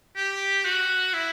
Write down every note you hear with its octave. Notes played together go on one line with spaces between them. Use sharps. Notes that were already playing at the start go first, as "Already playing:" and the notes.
G4
F#4
E4